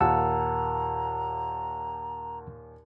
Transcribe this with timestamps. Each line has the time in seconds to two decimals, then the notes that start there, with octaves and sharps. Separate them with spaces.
0.01 D#2 A#2 F5 F#5 A5 A#5 E6